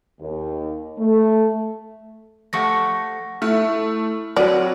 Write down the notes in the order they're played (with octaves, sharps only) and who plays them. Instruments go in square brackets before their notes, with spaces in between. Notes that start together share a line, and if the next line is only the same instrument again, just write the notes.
[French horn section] D#2
A3
[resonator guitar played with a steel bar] F3 A3 G4 [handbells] F#5 C#6 A#6
[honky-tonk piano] A3 [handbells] E4 F6 [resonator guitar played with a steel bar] E5
[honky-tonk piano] F#3 [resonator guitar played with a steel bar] G3 [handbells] C4 C#5 [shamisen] D5